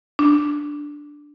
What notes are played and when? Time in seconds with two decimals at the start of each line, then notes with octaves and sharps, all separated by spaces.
0.19 D4